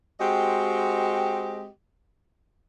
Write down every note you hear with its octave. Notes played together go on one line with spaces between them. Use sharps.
G#3 C4 F#4 G4 D#5